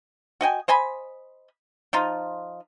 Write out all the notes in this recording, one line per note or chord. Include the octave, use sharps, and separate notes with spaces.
F#4 D#5 G5 G#5
C5 D#5 G#5 B5
F3 D#4 F4